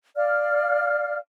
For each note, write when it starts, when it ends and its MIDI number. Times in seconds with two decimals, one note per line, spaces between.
0.16 1.17 74
0.16 1.17 77
0.16 1.17 89